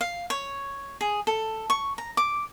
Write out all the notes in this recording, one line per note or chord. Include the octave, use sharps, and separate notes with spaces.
F5
C#5
G#4
A4
C#6
A#5
D6